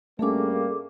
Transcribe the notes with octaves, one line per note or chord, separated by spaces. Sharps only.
G2 G3 A3 A#3 C#4 G#4 A4 D6